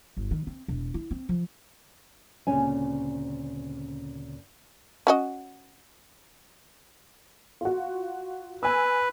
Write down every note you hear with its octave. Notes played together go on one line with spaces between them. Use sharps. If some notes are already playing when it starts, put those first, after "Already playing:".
G1
D#3
C4
E1
E4
C4
F3
D2 A#2 C#3 C4 C#4 G#5
C#4 F#4 D#5
F4 F#4
B4 G#5 E6